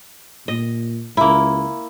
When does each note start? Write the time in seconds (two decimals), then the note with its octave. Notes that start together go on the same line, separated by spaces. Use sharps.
0.48 A#2 D#5
1.17 C#2 A#3 E4